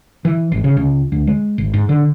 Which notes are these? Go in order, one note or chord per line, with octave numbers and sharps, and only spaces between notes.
E3
G#1
C#3
C#2
D2
G#3
G#1
G#2
D3